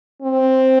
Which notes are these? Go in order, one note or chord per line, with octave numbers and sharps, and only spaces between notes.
C4